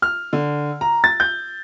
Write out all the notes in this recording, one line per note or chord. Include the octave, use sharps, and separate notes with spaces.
F6
D3
A#5
A6
G6